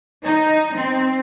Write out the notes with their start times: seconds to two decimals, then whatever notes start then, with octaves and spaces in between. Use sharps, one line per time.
0.24 D#4
0.76 C4